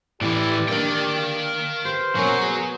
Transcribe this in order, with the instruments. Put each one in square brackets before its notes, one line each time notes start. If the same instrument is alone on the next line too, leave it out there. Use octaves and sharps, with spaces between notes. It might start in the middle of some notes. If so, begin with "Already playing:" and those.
[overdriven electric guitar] A2 E3 [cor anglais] G4 [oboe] D5
[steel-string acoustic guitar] A#3 D4 [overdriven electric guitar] A#4 G5
[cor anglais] F5
[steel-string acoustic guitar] G4 B4 [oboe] C5
[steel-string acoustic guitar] B2 A#3 [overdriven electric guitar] F#3 [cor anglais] C#4
[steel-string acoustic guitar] B3 [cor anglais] G#4